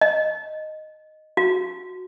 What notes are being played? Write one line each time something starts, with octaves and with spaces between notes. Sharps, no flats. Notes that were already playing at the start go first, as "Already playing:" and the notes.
D#5
F#4